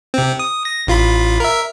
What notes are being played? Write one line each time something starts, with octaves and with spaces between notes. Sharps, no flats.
C3 C4
D#6
A#6
A1 F4 B5
A#4 E5